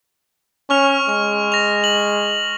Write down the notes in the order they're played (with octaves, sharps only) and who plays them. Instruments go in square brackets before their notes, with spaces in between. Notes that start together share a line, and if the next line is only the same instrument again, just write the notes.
[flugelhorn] C#4 [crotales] C#6 F6 F7
[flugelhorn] G#3 [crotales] C#6
[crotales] A#6 F7
F#7